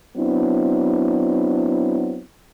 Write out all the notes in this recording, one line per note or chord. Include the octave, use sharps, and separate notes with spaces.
F#3 B3 C4 D4 E4